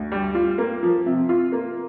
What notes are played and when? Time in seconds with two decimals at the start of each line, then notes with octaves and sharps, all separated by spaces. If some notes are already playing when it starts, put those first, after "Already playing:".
Already playing: D2
0.12 G3
0.34 F4
0.58 A#3
0.83 F3
1.06 C3
1.29 F4
1.52 A#3